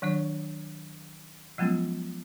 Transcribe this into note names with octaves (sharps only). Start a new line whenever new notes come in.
D#3 F#3 D4 C#5
F3 F#3 G#3 B3 C#4 F4